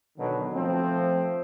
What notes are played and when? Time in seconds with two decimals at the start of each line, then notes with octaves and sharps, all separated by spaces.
0.18 B2 D3 D#3 F#3
0.55 F3 A3 C4